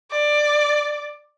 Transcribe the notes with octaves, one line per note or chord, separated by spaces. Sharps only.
D5